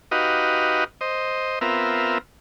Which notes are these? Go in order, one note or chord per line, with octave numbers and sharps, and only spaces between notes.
D#4 F#4 G4 B4 D#5 F5
C5 D#5
B3 C4 F4 A#4 E5